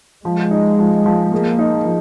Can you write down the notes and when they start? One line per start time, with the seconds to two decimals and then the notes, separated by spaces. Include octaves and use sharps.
0.24 F3 G#3
0.51 D#4
0.79 F3
1.06 F3
1.32 G#3 A#3
1.59 D#4
1.85 F3